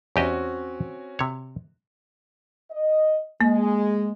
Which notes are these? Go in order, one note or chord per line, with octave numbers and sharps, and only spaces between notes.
E2 C4 C#4 F#4 G4 D#5
C3 C#5
D#5
G#3 A#3